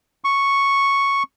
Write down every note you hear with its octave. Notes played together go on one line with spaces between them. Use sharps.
C#6